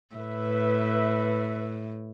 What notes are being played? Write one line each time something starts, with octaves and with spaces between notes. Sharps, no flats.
A2 B4 E5